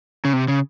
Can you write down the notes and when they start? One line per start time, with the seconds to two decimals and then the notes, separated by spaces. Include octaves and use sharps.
0.25 C#3
0.33 C3
0.48 C#3